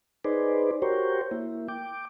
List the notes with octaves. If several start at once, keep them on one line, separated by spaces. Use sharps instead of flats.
D#4 G#4 B4 C5 D5
F#4 G4 A#4 C5 C#5 G5
A#3 E4
G5 D6